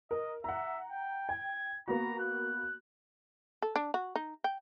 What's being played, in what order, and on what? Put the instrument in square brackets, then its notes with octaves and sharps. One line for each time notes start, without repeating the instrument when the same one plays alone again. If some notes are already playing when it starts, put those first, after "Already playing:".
[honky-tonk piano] A#4 [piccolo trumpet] D#5
[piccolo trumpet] E5 [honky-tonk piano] F#5 A#5
[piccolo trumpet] G5
[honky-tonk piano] G5 [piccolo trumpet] G#6
[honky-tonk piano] A#3 B3 F#4 [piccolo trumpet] A#5
[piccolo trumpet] F#6
[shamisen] A4
D4
F#4
D#4
G5